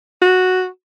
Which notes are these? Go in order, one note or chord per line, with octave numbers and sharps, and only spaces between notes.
F#4